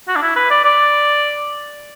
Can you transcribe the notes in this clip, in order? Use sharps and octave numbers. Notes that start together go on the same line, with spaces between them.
F#4
D4
E4
B4
D5
D5